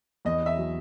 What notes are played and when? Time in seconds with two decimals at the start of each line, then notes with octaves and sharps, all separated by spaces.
0.25 E2 D#5
0.42 E2 E5
0.58 F#3